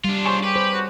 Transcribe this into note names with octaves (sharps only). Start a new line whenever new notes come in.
G3 D4 F4
G#4 C5 C#5 A5
G4 B4
C5
F#4